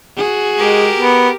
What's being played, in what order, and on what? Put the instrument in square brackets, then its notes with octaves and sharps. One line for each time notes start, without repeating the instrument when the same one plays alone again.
[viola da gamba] F#4 G#4
[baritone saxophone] G#3 [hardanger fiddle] G4 A#4
[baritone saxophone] B3